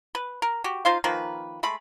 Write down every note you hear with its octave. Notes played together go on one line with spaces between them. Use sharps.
B4
A#4
F#4 G4
D#4 F4 C5 F5
D#3 F3 A#3 B4
G#3 A3 B5